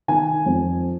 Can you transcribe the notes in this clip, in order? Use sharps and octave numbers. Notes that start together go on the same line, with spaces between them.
D#3 G#5
F2